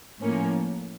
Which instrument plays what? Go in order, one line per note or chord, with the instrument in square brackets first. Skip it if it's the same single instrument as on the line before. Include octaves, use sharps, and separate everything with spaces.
[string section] A2 F3 A#3 C#4